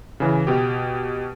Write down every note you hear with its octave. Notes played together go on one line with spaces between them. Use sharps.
C#3 E3
B2 G4